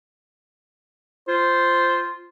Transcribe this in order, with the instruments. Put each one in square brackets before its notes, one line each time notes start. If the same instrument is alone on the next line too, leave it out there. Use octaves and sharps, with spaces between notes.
[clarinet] F4 [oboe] C5